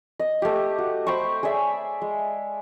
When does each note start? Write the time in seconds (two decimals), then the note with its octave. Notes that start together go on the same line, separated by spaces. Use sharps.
0.20 D#5
0.42 A3 G4
0.78 F#4
1.07 C5 G5 B5 C#6
1.43 G#4 C#5 D5 E5
2.02 G#3